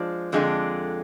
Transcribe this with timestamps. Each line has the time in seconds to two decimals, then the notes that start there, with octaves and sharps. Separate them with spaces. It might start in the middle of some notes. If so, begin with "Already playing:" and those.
Already playing: F3 G#3 D4
0.33 F2 D3 G#3 D4